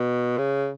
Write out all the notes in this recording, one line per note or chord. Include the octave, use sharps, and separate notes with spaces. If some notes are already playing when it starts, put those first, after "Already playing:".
Already playing: B2
C#3